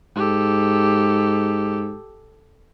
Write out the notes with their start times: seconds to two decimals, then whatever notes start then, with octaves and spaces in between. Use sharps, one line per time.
0.16 G#2 G4 A4